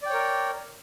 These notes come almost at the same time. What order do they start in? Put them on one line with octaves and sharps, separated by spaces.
D5 G5 C#5 A#4